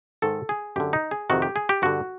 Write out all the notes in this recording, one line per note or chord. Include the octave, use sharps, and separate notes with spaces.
G#2 D#3 A4
G#4
F#2 D3 G4
D#4
G#4
F2 C3 D#3 F#4
G4
G#4
G4
G2 D3 F#4